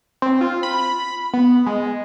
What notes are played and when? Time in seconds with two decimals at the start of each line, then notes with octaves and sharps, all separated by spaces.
0.22 C4
0.41 F4
0.63 B5
1.33 B3
1.66 G#3